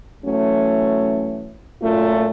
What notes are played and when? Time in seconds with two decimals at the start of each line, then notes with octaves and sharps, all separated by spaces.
0.25 E3 F#3 A3 C#4
1.82 F#2 A#2 A3 F4